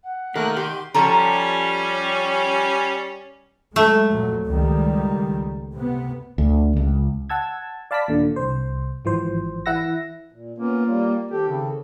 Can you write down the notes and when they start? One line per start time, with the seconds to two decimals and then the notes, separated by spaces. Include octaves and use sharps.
0.04 F#5
0.36 D#3 A3 A#3 A#4 F#6
0.57 G4 C6
0.94 F3 G3 C#4 A4 A#5
3.76 F#3 G#3 A3
4.10 F2 A#2 F#3
4.47 C#2 D#3 G3
5.73 C3 B3
6.38 D2
6.77 C#2
7.29 F#5 A5 E6 G#6
7.91 D5 F5 A5 B5 D6 B6
8.08 D#2 A#2 D3
8.36 C2 C5
9.05 G#1 E3 F3 C5
9.66 E3 E4 F#5 E6 A#6
10.32 A#2
10.58 A#3 B3 C#4 F4
10.86 G3 F4
11.31 D#3 C4 G4 A4
11.49 C#3